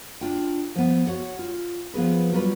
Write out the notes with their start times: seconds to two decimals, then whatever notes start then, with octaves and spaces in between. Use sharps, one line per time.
0.21 D4 F4 G5
0.75 F3 B3
1.07 F#4 C#5 F#5
1.39 F4
1.94 F3 B3 G#4 B4
2.33 F#3 G3 F4 A4 B4